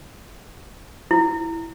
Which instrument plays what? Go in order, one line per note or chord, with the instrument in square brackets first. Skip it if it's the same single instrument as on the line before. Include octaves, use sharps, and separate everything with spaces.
[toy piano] E4